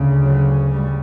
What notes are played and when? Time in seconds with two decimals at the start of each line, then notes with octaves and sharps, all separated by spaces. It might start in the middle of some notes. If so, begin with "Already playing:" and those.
Already playing: D2 C#3
0.23 F#3
0.71 G3